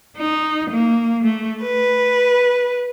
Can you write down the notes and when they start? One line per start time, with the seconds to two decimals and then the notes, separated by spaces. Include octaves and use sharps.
0.16 D#4
0.70 A#3
1.23 A3
1.62 B4